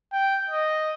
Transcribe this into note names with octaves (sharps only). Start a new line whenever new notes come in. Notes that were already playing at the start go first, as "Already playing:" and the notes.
G5
D#5